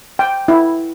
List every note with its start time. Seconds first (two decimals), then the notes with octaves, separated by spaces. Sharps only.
0.19 G5
0.48 E4